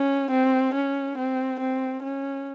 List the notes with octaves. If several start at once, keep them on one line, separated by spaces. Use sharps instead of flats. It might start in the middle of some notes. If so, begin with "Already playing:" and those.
Already playing: C#4
C4
C#4
C4
C4
C#4